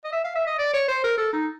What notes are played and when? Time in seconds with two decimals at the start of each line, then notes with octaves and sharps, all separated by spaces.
0.04 D#5
0.12 E5
0.24 F5
0.35 E5
0.47 D#5
0.58 D5
0.74 C#5
0.88 C5
1.04 A#4
1.18 A4
1.33 D#4